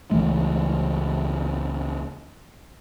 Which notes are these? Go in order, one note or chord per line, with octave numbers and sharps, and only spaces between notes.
C#2 E3 G#3 A3